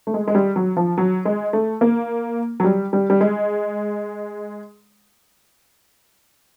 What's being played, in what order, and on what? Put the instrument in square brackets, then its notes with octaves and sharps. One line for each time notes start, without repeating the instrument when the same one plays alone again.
[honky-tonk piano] A3
G#3
G#3
G3
F#3
F3
F#3
G#3
A3
A#3
F#3
G3
G3
G3
G#3